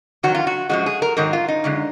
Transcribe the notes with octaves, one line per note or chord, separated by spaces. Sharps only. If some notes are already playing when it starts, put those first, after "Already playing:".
F2 D#3 F#3 F#4
F4
F#4
F#2 F3 G#3 F#4
G#4
A#4
G#2 D#3 F#3 A#4
F4
D#4
F#2 D3 G#3